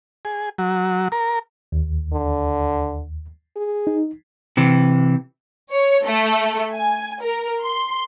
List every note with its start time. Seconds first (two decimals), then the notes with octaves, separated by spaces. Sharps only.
0.25 G#4
0.58 F#3
1.12 A#4
1.72 D#2
2.13 D3
3.56 G#4
3.87 D#4
4.57 C3 E3
5.72 C#5
6.06 A3
6.72 G#5
7.21 A#4
7.62 C6